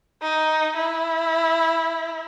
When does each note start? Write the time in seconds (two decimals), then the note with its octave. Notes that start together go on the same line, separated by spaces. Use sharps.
0.22 D#4
0.76 E4